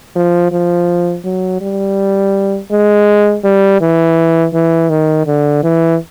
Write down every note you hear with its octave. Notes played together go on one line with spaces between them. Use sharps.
F3
F3
F#3
G3
G#3
G3
E3
E3
D#3
D3
E3